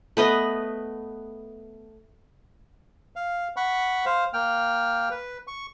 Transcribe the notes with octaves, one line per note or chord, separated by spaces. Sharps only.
A3 B3 B4 D#5
F5
F#5 B5 C#6
C5 F5
A#3 G5 F6
B4
C#6